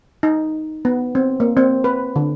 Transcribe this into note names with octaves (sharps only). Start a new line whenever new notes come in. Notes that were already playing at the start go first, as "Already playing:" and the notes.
D#4
B3
C4
A#3
C4
B4
D3